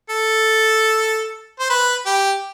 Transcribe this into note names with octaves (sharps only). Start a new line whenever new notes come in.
A4
C5
B4
G4